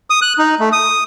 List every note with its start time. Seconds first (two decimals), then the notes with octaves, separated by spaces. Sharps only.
0.10 D#6
0.22 F#6
0.38 D#4
0.60 A3
0.72 D#6